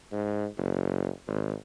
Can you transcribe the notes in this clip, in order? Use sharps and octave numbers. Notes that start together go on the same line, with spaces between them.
G#2
F#1
G#1